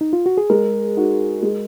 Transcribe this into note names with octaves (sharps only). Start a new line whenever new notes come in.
D#4
F4
F#4
G#4
G#3 A#4
D#4 F#4
G#3